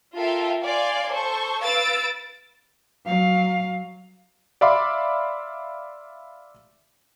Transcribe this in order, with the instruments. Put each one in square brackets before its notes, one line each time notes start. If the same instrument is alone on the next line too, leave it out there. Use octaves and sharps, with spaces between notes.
[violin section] F4 A4 A#4 E5 F5 G5
D5 F5 G#5 C6 D6
A4 C5 C#6
B4 F5 E6 A6 D7
[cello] F#3 F5
[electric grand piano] D5 E5 F5 B5 C6 D6